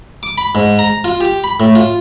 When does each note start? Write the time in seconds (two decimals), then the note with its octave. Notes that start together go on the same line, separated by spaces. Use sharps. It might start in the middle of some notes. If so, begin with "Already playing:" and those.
0.23 D6
0.38 B5
0.55 G#2
0.79 A#5
1.04 F4
1.21 G4
1.44 B5
1.60 A2
1.75 F4